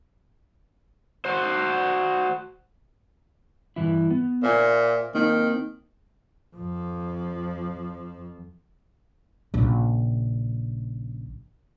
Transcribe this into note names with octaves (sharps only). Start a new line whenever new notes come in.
F#4 C5
G2 E3 E4
B3
A#2 C5 E5 G#5
D#3 A#3 C4 D#4
F2 F3
A#1 C#3